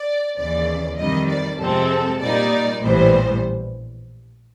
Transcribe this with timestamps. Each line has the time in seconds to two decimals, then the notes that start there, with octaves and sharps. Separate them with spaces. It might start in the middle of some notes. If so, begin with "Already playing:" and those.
Already playing: D5
0.37 D#2 C#3 E3 D5
0.97 F2 C3 D#3 G3 D#5
1.29 D5
1.59 F2 C3 F3 G#3 C4 A4
2.20 A#2 G3 A#3 D#4 D5
2.81 A#1 A2 E3 G3 B3 C5